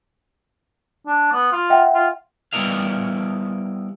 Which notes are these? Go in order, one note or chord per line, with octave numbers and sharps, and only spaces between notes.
D4
B3
F4
E5 F#5 G5
F4
G3 B3 E4 A#4 D#5 F5